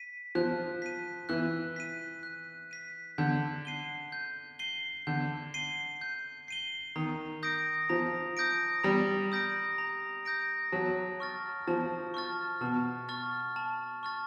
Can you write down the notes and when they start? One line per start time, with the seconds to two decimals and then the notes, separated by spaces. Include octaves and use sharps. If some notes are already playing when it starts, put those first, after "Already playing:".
Already playing: B6 D#7
0.35 F3 F#6
0.82 B6 D#7
1.29 E3 F#6
1.76 B6 D#7
2.23 F#6
2.71 B6 D#7
3.18 D3 G6
3.65 C7 D#7 G7
4.12 G6
4.59 C7 D#7 G7
5.07 D3 G6
5.54 C7 D#7 G7
6.01 G6
6.48 C7 D#7 G7
6.96 D#3 A#5
7.43 D#6 G6 A#6 D7
7.89 F3 A#5
8.37 D#6 G6 A#6 D7
8.84 G3 A#5
9.32 D#6 G6 A#6 D7
9.78 A#5
10.25 D#6 G6 A#6 D7
10.72 F#3 A5
11.20 C#6 F6 A6
11.68 F3 A5
12.14 C#6 F6 A6
12.61 B2 A5
13.09 C#6 F6 A6
13.56 A5
14.03 C#6 F6 A6